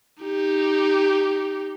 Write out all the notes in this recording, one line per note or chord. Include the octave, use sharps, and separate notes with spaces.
D#4 G4